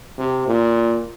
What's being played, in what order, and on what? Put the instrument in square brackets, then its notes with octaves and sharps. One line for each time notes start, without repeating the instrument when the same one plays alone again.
[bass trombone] C3
A#2